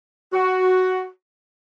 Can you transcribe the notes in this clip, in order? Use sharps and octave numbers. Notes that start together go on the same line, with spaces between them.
F#4